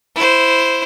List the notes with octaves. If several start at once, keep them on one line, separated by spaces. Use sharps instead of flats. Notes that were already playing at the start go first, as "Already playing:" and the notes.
E4 C5